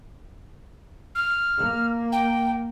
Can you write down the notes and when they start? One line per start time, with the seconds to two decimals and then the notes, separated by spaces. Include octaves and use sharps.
1.15 F6
1.57 A#3
2.12 G5